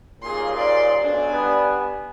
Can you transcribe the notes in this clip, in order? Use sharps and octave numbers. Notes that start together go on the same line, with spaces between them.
D#2 A#2 C#3 G#4 C6
D5 C6
B1 D4 G#5
G3 B3